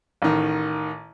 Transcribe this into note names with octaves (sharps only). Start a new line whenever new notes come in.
A1 D#3